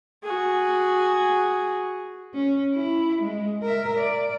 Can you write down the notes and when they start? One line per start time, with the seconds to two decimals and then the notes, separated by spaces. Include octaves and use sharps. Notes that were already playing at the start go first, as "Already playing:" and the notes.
0.23 F#4 G#4
2.35 C#4
2.75 E4
3.22 G#3
3.63 A#4 E5
3.98 D5